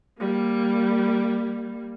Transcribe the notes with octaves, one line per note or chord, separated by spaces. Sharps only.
G3 A#3